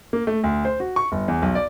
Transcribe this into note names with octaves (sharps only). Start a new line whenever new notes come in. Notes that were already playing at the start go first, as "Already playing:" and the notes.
A#3
A3
D2
C5
F#4
C#6
G1
E2
B1
D5